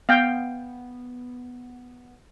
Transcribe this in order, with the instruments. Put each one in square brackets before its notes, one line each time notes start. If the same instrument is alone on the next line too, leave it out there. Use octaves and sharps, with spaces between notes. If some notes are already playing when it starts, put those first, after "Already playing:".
[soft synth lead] B3 [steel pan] F5 G5